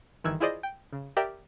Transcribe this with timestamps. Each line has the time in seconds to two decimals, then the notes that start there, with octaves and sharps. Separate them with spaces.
0.24 G1 D#3 E3 E6 F#6 G#6
0.40 E4 F4 G#4 C5 D5 D#5
0.63 G5
0.93 C#3
1.17 G4 A#4 D5 E5 G5